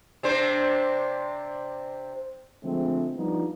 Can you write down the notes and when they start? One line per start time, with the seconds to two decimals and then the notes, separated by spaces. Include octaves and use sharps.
0.23 C3 D4 C5
2.63 D3 F3 G#3 A3 C4
3.16 F3 G3 B3 D4 D#4 F4